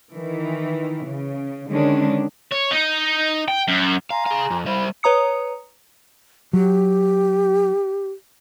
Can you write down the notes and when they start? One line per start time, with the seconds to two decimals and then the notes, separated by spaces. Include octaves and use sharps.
0.12 D#3 E3
1.06 C#3
1.68 D3 D#3 G#3 C#4 D4
2.52 C#5
2.71 D#4
3.48 G5
3.68 F#2
4.10 F5 G#5 A#5 C6
4.26 G#4 F5
4.50 F2
4.66 G3 C5 E5 F5 B5
5.03 B4 C#5 A#5 D#6 C#7
6.53 F#3 G4